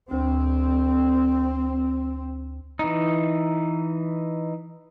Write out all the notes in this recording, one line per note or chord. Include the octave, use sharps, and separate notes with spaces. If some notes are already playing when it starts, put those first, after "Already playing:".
D2 C4
E3 D#4